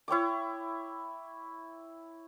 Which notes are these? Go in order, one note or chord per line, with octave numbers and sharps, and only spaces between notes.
E4 C#5 G5 D6